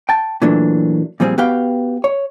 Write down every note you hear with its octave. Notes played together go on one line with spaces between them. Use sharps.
G5 A5
A#2 E3 F#3 A3 D4
A#2 F3 G3 C4 G#4
B3 F#4 G4 B4 F5 G5
C#5